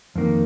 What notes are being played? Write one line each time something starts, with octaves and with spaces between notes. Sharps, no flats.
F2 D#3 A#3